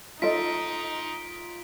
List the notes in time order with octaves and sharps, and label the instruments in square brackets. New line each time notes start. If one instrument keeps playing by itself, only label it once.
[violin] D#4 [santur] F4 [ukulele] A4 D#5 [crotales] B6 D7